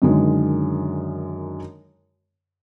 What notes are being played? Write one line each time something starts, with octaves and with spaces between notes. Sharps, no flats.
F#2 D3 D#3 G#3